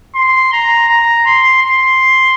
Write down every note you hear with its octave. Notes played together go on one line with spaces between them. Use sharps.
C6
A#5
A#5
C6
C6